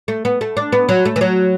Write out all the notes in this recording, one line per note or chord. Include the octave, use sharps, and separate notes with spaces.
A3
B3
A3
D4
B3
F#3
A3
E3
F#3